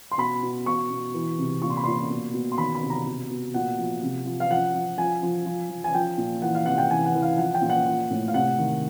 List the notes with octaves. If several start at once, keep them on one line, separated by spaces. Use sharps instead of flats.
C6
B2 B5
B2
B2 C#6
B2
E3
C3
A#2 C#6
C6
B5
A#2 C6
B2
B2
C6
D#3 B5
B5
C3
A#5
B2
B2
A#2 F#5
F3
C3
F3
F5
F3 F#5
F3
F3 G#5
F3
F3
F3
G#5
F3 G5
A#2
E3 F#5
F5
C3 F#5
G5
E3 G#5
F#5
E3
F5
F3 F#5
G5
A#2
F#5
F3
A2
F5
C3 F#5
D#3